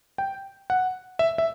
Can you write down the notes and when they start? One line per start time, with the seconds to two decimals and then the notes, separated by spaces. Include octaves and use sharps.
0.18 G5
0.70 F#5
1.19 E5
1.38 E5